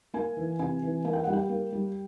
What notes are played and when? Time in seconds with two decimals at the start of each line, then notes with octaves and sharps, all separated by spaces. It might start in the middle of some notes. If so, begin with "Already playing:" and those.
0.14 A#3 G#5
0.37 E3
0.59 C3 G#5
0.82 E3
1.04 A#3 G#5
1.13 G5
1.24 G3 F#5
1.33 G5
1.49 A#3
1.73 G3